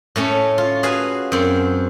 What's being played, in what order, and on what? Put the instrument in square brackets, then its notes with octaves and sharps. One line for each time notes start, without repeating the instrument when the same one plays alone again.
[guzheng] A2 A3 C#4
F4
F#4 G#4 B4 F5 G#5
F#2 C4